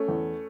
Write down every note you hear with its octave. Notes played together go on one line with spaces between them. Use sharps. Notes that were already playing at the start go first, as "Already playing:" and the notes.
Already playing: A3 C#4
E2